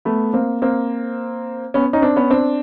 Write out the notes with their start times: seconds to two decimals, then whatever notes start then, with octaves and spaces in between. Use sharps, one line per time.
0.05 A3 B3
0.33 A#3 C4
0.62 A#3 C4
1.74 B3 C#4
1.93 C#4 D#4
2.02 C4 D4
2.16 B3 C#4
2.30 C4 D4